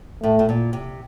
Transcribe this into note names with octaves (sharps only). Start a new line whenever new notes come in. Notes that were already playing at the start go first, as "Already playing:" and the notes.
A2 A3
A2
A#2
C3